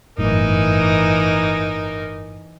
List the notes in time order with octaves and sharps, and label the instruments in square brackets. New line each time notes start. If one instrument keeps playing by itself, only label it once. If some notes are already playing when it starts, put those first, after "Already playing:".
[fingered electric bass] G1 F#2 A2 [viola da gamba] E3 D#4 [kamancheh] A#4